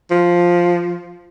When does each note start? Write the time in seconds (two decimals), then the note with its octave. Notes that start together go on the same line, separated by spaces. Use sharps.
0.11 F3